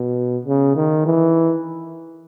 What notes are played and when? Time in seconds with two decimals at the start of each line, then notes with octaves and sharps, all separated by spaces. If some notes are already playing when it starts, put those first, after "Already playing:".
Already playing: B2
0.45 C#3
0.76 D#3
1.06 E3